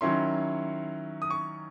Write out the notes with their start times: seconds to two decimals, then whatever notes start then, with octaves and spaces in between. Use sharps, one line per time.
0.01 D#3 F#3 C#4 E4 C6
1.22 D#6
1.30 C#6